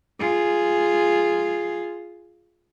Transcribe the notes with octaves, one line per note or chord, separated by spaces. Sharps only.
F4 G#4